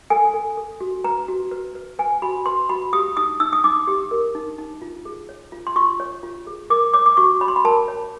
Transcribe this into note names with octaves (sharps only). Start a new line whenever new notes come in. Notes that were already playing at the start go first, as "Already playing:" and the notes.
A4 G#5
A4
A4
F#4
B4 A#5
F#4
B4
B4
B4 G#5
F#4 B5
B4 C6
F#4 B5
G4 D#6
D#4 D#6
D#4 E6
D#6
D#4 D6
G4
A#4
D#4
D#4
F4
G#4
C#5
F4
C6
F4 C#6
C#5
F4
G#4
A#4 D6
C#5 D6
D6
F#4 C#6
C#5 B5
C6
B5
A#4 A5
C#5